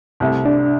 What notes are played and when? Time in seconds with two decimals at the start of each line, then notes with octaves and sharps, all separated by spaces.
0.20 C2 C3 A3 E4
0.46 D4